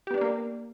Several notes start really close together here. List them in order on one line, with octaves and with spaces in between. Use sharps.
G4 B3 D4 D5 A#3